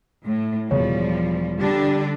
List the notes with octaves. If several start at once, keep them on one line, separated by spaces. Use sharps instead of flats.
A2
E1 F3 G3 C#5
D3 G3 D4